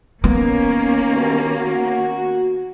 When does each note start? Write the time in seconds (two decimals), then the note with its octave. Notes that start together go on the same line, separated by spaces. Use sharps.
0.24 D#3 A#3 B3 C#4
1.11 D2 G2 B2
1.55 F#4